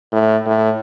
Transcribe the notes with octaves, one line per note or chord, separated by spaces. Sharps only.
A2
A2